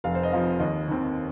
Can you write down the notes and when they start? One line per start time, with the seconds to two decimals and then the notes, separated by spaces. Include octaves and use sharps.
0.04 F1 F5
0.15 C5
0.23 D#5
0.32 F2 F3 F5
0.60 D#2 D#5
0.88 D#3 C4